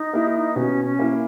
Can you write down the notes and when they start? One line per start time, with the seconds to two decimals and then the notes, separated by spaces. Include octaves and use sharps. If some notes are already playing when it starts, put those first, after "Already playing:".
Already playing: D#4
0.13 A#3 E4
0.56 B2 C#4
0.85 C#4
0.99 A#3 E4